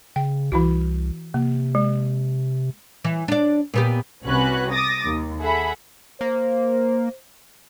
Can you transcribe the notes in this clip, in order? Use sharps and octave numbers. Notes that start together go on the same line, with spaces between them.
C#3 G5
C2 E3 E4 F#4
C3 A#3
G#3
E3
D4 D5
A#2 B3 G4
C2 C3 C#4 F#4 B4 F#6
D6 D#6 A6 A#6
D#2
G#4 A4 E5 F#5 B5
A#3 C5